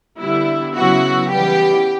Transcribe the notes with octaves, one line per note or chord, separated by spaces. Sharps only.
D3 G3 B3 E4
C#3 F#3 B3 E4 F#4
C#3 E3 G3 B3 G4